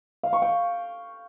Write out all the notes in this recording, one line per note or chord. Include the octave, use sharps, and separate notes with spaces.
F5
C#6
G5